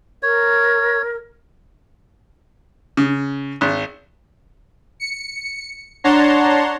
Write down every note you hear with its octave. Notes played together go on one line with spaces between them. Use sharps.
A#4 C#5
C#3
G#1
C#7
D4 C#5 F#5 A5 A#5 C6